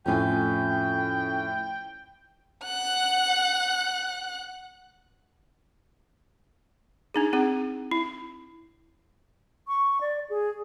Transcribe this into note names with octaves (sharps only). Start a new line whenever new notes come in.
F2 A2 C#4 F4 G5 G#5
F#5 F#6
D4 D#4 G#4
C4 D#4 G#4
E4
C#6
D5
G#4